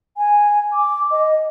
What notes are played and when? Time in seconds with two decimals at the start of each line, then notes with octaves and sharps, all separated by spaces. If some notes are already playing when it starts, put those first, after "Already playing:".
0.17 G#5
0.73 D6
1.11 D#5